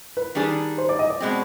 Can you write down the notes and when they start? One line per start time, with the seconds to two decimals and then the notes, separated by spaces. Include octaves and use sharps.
0.17 B4
0.35 D#3 G3 D4 G#4
0.78 C5
0.89 D5
0.99 D#5
1.10 D5
1.20 B2 G#3 C4